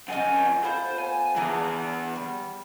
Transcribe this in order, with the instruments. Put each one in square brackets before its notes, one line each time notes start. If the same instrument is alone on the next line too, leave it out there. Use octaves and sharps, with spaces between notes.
[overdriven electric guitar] F2 G#5 [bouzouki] C#4 D#5 F#5
[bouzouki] A3 B3 F4 [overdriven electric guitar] C5
[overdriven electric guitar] G#5
[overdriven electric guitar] E3 B3 [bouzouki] D4 G#4 A#5
[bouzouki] G3